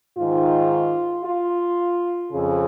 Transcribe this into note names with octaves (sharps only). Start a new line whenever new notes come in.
G#2 D#3 F4
F4
F2 C#3 G#4